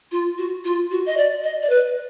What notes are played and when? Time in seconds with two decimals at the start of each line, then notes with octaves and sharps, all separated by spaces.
0.12 F4
0.38 F#4
0.65 F4
0.91 F#4
1.06 D#5
1.17 D5
1.44 D#5
1.63 D5
1.70 B4